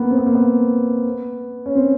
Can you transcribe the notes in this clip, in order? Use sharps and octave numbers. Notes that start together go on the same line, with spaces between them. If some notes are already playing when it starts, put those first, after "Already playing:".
Already playing: A#3 B3
C4
B3
A#3
B3
C#4
C4